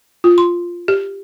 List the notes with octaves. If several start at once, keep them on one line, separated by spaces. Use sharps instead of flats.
F4
C6
G4